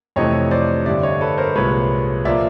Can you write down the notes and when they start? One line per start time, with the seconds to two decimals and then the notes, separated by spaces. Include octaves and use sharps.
0.16 F2 C3 E3 A3 C#5 D#5
0.51 C5 D5
0.86 G2 D3 G3 D5 E5
1.03 C#5 D#5
1.21 A4 B4
1.38 A#4 C5
1.55 C2 A#2 F3 G#3 B4 C#5
2.25 A#2 F3 A#3 D5 E5